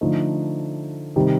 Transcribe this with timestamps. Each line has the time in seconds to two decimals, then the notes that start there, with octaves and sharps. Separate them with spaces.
0.01 D3 F3 A3 D#4
1.16 C3 D#3 G3